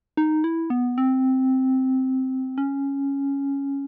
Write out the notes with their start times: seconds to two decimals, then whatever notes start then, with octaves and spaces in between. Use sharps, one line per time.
0.17 D#4
0.44 E4
0.70 B3
0.98 C4
2.58 C#4